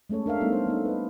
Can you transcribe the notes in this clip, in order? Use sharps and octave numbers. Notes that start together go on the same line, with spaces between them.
G#3 A3 C#4 A4 C#5
D4 A#4 E5 F5
G3 A3 B3 C#4 D#4 A4
C5
A#3 D#4
B4 D#5